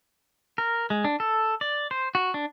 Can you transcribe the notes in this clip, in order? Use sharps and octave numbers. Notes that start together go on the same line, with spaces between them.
A#4
G#3
D4
A4
D5
C5
F#4
D4